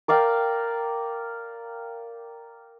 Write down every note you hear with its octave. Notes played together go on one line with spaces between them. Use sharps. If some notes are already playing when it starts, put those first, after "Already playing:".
A#4 D5 F5 G5